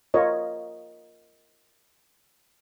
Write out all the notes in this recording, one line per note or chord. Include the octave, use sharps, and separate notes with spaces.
F4 A#4 C#5 D#5